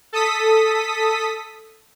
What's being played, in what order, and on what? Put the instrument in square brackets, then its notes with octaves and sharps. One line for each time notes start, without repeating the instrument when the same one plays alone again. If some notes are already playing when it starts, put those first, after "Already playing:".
[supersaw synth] A4 D#6 B6